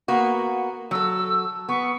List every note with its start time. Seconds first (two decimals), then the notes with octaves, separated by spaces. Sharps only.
0.08 A#3 B3 F#4
0.91 F#3 A4 E6
1.69 B3 C#6